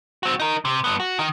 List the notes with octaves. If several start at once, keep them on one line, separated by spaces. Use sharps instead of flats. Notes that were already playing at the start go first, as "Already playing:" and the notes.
C4 F#4
D#4 A#4
C3
G2 B3
F#4
D#3 D#4